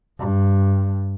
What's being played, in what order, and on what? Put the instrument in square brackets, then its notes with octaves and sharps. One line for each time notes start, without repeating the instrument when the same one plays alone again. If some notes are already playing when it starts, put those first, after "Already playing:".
[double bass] G2